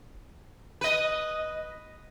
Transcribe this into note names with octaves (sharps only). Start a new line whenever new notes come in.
B4 D#5